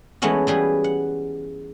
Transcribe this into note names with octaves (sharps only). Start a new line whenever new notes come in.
E3 G#3 A3 B3 C#4 F#4
E3 G3 G#4 B4
F#5